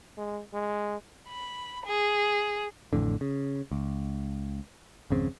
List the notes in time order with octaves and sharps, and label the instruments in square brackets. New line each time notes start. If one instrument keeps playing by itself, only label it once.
[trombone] G#3
G#3
[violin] B5
G#4
[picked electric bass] A1 F2 A2 D3
C#3
C#2
G#1 F2 C#3 C4